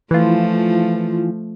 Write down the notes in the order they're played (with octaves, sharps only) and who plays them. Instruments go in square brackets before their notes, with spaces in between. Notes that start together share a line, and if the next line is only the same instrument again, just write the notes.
[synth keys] E3 F4 [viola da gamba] F3 A3